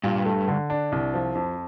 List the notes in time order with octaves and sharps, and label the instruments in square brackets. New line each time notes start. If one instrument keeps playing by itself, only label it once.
[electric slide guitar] G2 [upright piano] A#2
[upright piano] A3
D3
D4
C2
F3
F2